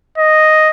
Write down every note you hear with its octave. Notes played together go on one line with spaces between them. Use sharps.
D#5